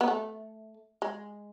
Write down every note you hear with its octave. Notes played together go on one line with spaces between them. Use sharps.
B3
A3
G#3